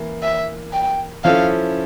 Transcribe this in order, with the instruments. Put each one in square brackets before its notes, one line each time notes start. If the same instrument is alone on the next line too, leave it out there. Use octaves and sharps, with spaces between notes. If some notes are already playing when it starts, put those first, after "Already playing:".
Already playing: [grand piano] E3 A#3 E4
[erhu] E5
G5
[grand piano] F3 C#4 E4 A4 [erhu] F5